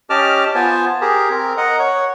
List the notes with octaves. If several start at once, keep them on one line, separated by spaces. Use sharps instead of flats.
C#4 G4 D#5 A5 D6 F6
B3 F4 C5 G#5 A5
G4 G#4 A#4
C4 A#4
A#4 D#5 F#5
C#5 F#5